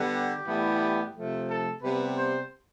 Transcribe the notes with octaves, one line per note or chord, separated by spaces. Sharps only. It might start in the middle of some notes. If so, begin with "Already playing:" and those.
Already playing: D3 G3 B3
G4
A2 E3 G3 B3
C3 F3 A3
A4
C3 G3 B3 B4
C5